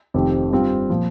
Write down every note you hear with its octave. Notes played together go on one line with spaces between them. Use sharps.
F1 F2 D#3 C4 G4
G2 G3 C4 F4
A#2 F3